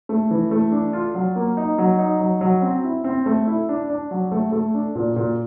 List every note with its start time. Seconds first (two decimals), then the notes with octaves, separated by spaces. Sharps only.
0.09 A3
0.31 E3
0.51 A3
0.72 D4
0.93 F4
1.15 F#3
1.36 A#3
1.57 D#4
1.78 F#3
1.99 D#4
2.20 F#3
2.41 F#3
2.62 C4
2.84 E4
3.04 C4
3.26 A3
3.47 E4
3.69 D4
3.90 D4
4.11 F#3
4.32 A3
4.52 A3
4.74 D4
4.95 A#2
5.16 A#2